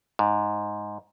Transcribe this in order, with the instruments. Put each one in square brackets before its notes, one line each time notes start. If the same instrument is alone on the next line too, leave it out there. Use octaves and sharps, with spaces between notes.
[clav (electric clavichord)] G#2